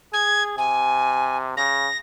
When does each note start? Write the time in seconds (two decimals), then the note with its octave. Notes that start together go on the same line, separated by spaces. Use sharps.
0.13 G#4 G#6
0.58 C3 G#5
1.57 C#3 A#6